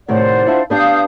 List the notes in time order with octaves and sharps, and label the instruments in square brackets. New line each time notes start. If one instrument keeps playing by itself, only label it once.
[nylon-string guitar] A2 C3 D#3 [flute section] C5 D5 F#5
[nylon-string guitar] D4 E4 F4
[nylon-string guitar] B3 D4 G4 [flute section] F5 D#6 G6